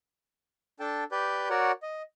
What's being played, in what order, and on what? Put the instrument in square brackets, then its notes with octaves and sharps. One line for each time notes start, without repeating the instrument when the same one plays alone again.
[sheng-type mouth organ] D4 A4 G5 A5
G4 B4 D5 G6
F#4 A#4 C#5 D5 F#5
D#5